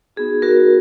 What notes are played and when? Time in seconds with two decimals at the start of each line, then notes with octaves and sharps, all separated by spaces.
0.16 B3 D#4 F#4 G#4
0.42 F#4 A#4